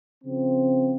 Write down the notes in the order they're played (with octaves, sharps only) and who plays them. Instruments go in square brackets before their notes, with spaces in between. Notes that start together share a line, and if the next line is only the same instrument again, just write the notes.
[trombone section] C#3 F3 C4